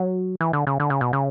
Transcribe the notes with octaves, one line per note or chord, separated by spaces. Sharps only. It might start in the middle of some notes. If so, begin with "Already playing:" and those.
Already playing: F#3
E3
D3
C#3
D3
C#3
B2
C#3